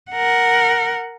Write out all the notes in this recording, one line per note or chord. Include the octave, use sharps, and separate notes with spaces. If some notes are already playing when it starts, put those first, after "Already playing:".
A#4 F#5